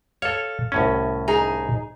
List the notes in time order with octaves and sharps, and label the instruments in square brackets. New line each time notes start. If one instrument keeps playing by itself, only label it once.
[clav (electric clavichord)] A4 C#5 [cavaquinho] F5
[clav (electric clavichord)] C2 A2 C#4
[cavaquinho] D#4 G#4